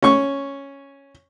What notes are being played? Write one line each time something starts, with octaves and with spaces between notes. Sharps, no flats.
C#4 C#6